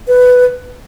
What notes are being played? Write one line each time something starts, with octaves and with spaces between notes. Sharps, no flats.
B4